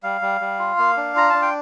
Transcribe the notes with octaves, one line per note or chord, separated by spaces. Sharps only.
G3 F5
G3
G3
F4
A#3
D4
F4 A#5
D4 A5
G5